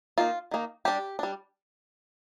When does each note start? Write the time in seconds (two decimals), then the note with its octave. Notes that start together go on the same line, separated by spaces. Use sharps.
0.18 D#3 A#3 D#4 F4
0.51 D#3 A#3 D#4
0.85 G3 D4 G4
1.19 G3 D4